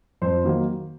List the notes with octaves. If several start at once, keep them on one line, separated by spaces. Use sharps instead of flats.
F2 C5
D#3 F#3 A#3